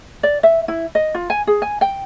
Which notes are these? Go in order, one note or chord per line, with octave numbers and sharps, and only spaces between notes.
D5
E5
E4
D#5
F4
G#5
G#4
G#5
G5